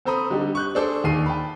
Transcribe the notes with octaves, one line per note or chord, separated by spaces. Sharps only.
C4 A4 C5 A#5 B5 D#6
D3 G3 D#4 G4
C#6 F#6 G6
D4 G#4 A4 C5 D5
D#2 D#3 G#4 C7 D#7
G5 A5 B5